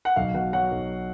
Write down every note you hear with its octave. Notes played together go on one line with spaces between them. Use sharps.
F#5
B1 F5
B2 F#5
F#3 F#5
B1